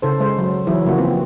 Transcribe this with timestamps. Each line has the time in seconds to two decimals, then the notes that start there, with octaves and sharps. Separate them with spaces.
0.02 C#3 A4 C5
0.20 G#3 C5
0.39 F#3
0.67 E3 F#3 E4 G#4 C5
0.85 C#3 F3 A#3 F#4
0.98 C4 F4 B4